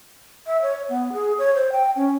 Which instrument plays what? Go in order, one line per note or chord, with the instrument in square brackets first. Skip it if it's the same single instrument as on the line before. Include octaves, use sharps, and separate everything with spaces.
[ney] E5
C#5
B3
G#4
C#5
C5
G5
C#4